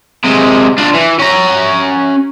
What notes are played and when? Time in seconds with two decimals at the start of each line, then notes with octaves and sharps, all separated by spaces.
0.24 C3 G#3
0.78 D4 F4
0.94 E3
1.19 C#4 A#5